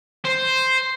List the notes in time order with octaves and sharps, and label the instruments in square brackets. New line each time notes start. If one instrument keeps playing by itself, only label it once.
[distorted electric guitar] C5